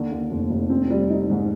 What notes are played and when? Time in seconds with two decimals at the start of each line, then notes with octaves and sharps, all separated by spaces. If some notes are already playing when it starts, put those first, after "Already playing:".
Already playing: D#2 D3
0.12 D#2
0.31 F1
0.50 F1
0.70 C4
0.90 G3
1.10 D#4
1.30 G#2